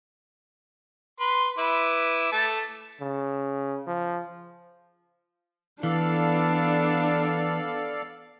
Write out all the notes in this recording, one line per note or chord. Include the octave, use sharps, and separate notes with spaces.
B4 C6
E4 B4 D6
A3 A5
C#3
F3
E3 B3 D4 A4 D5 F5